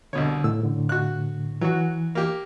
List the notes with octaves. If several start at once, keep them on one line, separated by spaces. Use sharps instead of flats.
C2 B2 D3 C#5
A2 E6
A2 D3
F#4 F#6
E3 F#3 F#4
A#3 G4